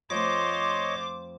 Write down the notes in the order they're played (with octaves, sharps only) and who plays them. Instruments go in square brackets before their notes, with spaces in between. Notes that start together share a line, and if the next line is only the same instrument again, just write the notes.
[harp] F2 A3 [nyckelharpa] F4 C5 [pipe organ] C#5 D#5 [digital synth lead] D6